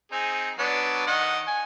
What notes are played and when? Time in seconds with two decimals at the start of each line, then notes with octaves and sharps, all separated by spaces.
0.12 C4 D#4 G#4
0.59 F#3 B3 D4
1.07 D#3 D#5 F#5
1.47 G#5